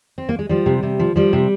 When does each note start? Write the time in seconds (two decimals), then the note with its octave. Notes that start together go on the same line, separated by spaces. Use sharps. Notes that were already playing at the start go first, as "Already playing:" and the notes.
0.18 C4
0.29 A#3
0.39 G#3
0.49 F3 G3
0.66 C3
0.83 C3
0.99 F3
1.16 F3 G3
1.33 C3